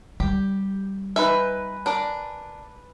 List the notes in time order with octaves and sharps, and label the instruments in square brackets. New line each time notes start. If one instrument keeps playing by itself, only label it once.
[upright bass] G3 [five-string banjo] G4
[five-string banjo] D#4 E5 [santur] B4 G#5
[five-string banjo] D4 A#4 D5